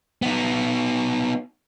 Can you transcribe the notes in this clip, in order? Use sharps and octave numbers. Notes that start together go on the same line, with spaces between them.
B3 D#4